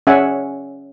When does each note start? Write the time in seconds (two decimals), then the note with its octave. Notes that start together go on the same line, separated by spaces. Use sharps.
0.07 C#4 G#4 D5 E5 F#5 G#5